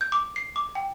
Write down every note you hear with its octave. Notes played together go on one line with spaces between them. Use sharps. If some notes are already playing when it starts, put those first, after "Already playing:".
G6
D6
C7
D6
G5